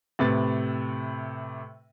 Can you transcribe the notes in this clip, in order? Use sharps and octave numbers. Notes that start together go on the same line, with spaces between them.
A2 C3 B4 A6